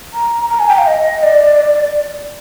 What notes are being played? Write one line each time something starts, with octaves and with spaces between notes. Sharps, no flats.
A#5
A#5
G#5
G5
F5
D#5
D5